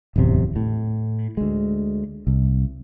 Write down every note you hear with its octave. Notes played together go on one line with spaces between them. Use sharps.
D1 A1 E2 C3
A2
D2 G#3
C2